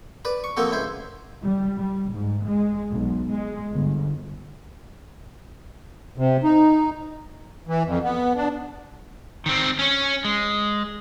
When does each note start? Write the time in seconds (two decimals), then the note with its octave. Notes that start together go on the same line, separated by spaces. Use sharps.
0.25 B4 D5
0.44 C#6
0.57 F3 A#3 C4 F#4 A4
0.71 C#2 E4 C5
1.42 G3
1.78 G3
2.12 G#2
2.46 G#3
2.91 B1
3.32 G#3
3.73 G1
6.18 C3
6.44 D#4
7.67 E3
7.85 F2
8.03 B3
8.36 D4
9.46 D#3 C4
9.79 C#4 C#5
10.25 G#3